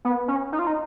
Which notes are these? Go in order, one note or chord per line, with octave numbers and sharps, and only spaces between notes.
B3
C#4
D#4
F4
D#4